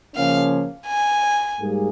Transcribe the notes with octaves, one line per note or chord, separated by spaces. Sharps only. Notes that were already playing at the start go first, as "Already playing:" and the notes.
C#3 F3 A#3 C#4 F5
G#5
G#2 G3 A#3 G#4